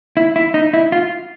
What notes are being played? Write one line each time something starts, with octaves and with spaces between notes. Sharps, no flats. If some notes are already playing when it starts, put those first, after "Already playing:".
E4
E4
D#4
E4
F4